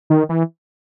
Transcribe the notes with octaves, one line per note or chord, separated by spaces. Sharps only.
D#3
E3